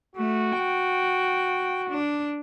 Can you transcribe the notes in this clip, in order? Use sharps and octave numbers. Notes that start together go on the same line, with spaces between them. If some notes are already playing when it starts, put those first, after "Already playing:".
A3 F#4
G5
D4